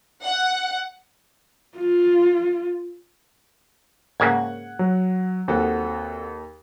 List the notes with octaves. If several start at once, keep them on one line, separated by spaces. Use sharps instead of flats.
F#5
F4
G#1 C#3 A#3 F#5 G#6
F#3
D#2 C4 F#4 A4